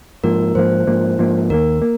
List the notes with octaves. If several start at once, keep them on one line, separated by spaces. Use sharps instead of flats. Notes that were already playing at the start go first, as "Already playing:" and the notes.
G#2 F3 A#3 A#4
G#2 F3 A#3 C5
G#2 F3 A#3
G#2 F3 A#3
D#2 D#3 F#3 A#3 A#4
A#3